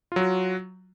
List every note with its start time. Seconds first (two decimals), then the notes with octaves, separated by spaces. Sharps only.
0.12 F4
0.16 F#3
0.21 F#4